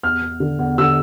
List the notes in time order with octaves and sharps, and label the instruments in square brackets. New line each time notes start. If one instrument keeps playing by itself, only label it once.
[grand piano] E2 F6
E2
D3
E2
D3 E6